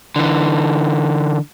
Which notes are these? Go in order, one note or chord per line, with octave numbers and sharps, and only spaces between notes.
D3 E3